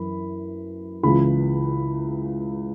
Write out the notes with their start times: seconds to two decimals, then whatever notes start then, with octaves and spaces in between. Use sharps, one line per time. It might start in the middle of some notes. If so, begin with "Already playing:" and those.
Already playing: F#2 E3 B5
1.03 C#2 C#3 E3 B5